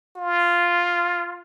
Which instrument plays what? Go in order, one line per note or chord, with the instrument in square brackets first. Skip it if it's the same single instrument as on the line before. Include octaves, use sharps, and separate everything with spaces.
[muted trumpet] F4